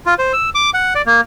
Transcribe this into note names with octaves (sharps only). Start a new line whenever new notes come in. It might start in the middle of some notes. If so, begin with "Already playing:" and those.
F4
C5
E6
D6
F#5
D5
A#3